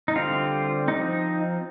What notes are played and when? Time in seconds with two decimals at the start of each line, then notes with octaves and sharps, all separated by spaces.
0.08 D#4
0.15 D3 G3 C4 F4
0.88 F3 C4 D#4